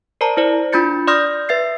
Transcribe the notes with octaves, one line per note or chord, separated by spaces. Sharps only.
A#4 C5 D5 A5 A#5
E4 C5 D5
D4 F4 B5 G6 A6 C#7
D5 C6 D#6 F6 G6 A#6
B4 E5 A6 C7